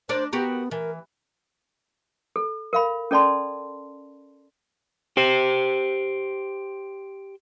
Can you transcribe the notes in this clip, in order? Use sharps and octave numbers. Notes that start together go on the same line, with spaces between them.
D4 A#4 C5 D5
B3 F#4 G4 A#4
E3 A#4
A4
A#4 F5 B5
C#4 A4 D5 A5 C6
G4 C5